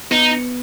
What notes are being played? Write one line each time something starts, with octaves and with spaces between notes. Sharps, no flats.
B3 D#4